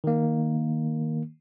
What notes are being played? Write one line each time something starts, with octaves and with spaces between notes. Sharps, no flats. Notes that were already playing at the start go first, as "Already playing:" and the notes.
D#3 A#3